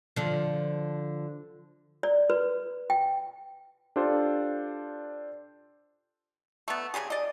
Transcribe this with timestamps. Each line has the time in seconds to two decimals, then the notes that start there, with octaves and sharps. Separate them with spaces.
0.16 D3 F3
2.03 D5
2.30 B4
2.90 G5
3.96 D4 F4 G4 A4 C5
6.68 A3 B3
6.94 C#3 F#3 G4 G#4
7.10 D5 D#5